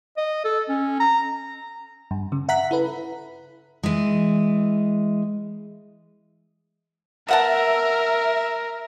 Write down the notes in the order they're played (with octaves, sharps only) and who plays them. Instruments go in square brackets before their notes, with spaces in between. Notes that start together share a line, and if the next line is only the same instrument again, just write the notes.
[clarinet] D#5
A4
C#4
A#5
[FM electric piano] G2
C#3
E5 F#5 A#5 F#6 B6
E4 A4 B4
[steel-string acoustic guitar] E3 G#3
[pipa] B3 F#5 A5 [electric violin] A#4 [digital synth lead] E5